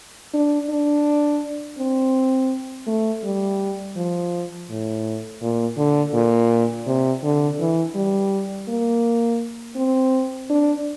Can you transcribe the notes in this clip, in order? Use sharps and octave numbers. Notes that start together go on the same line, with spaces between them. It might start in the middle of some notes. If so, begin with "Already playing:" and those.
D4
D4
C4
A3
G3
F3
A2
A#2
D3
A#2
C3
D3
E3
G3
A#3
C4
D4